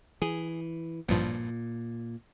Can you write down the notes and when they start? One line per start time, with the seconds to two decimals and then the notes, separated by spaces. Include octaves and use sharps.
0.22 E3 G#4
1.08 A1 G2 A#2 F3